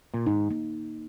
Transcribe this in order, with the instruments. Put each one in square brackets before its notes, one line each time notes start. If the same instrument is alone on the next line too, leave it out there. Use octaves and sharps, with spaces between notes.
[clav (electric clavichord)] A#2
[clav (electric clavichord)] G#2 [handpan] D#4
[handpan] A#3